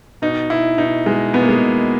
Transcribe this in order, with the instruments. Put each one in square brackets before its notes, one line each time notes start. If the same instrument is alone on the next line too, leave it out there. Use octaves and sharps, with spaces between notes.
[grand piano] B2 D#4
B2 E4
B2 D#4
B2 G#3
B2 B3
A#3
G#3
B2